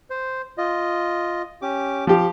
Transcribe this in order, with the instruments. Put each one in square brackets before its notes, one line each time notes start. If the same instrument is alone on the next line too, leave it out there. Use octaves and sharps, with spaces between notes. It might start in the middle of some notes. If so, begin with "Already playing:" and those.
[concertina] C5
F4 D#5
C#4 G4 D6
[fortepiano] F3 G4